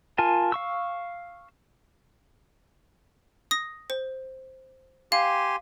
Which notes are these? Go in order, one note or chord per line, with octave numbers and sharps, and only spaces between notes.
F4 A#4 G#5 A5
F5 C#6 E6
D#6 A#6
C5
G4 F5 G#5 C6